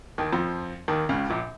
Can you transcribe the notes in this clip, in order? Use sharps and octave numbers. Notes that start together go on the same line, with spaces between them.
D#2 D#3
F2 F3
D#2 D#3
C#2 C#3
A#1 A#2